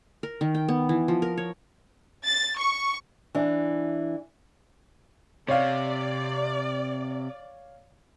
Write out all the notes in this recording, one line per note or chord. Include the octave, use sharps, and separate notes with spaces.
A#4
D#3
G5
B3
E3
F3
A#4
C#5
A6
C#6
E3 D4
C3 C#5 D5 F5